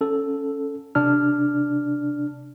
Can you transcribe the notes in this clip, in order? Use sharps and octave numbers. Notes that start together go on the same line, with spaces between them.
C#4 A4
C3 D4 F6